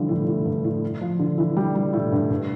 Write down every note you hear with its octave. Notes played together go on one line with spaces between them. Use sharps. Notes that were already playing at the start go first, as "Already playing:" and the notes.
Already playing: D3 E3 F3 G3
A2
A2
G2
A2
F3
D3
E3
G3
G3
A2
G2
G2